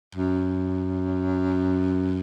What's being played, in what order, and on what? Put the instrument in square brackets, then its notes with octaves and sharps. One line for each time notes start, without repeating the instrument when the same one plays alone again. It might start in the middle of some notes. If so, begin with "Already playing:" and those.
[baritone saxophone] F#2